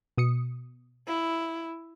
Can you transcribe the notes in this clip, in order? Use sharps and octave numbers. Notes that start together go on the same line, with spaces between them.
B2 D#6 C#7
E4